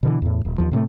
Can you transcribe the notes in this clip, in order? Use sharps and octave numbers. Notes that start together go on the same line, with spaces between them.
B2 D3 E3
E2 A2
D#1
D#2 F3
A2 C3 G3 A3